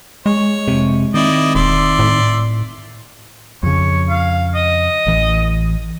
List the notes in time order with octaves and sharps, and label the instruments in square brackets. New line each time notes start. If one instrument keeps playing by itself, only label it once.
[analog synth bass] G#3 [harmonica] C#5
[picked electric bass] F1 C3
[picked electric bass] D#3 C4 [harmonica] E4 D5 D#5
[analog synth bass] E1 [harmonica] D5 E5 C6
[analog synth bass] A2
[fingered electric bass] F2 C#3 [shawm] C#5
[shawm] F5
D#5
[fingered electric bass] A1 E3